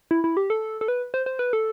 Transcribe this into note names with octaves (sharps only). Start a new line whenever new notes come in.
E4
E4
G4
A4
A4
B4
C5
C5
B4
A4